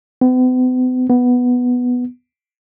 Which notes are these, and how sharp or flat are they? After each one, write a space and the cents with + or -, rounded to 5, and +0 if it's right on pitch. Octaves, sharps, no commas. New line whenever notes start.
B3 +45
B3 +0